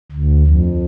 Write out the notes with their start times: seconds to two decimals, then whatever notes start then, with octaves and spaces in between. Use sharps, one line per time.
0.12 D2
0.47 F2